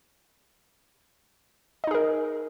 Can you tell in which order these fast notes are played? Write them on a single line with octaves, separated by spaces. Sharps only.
D#5 D#4 G#4 A#4